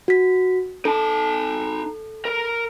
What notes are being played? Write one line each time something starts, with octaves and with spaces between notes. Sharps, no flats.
F#4 B6
D#4 A4 A5
A#4